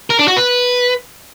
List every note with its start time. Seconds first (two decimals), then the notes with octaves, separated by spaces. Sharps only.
0.10 A#4
0.19 D4
0.28 F#4
0.37 B4